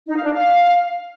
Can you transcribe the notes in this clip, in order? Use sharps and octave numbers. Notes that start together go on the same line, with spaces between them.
D#4
F5
D4
F5